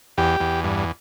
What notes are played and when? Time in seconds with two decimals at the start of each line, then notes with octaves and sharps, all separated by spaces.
0.18 E2 G4
0.40 E2
0.64 G2